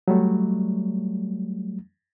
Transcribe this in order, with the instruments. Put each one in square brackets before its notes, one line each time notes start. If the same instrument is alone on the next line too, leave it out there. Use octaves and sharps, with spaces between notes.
[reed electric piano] F#3 G3 A3